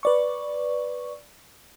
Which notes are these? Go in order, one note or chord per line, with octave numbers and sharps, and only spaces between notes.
B4 D5 C#6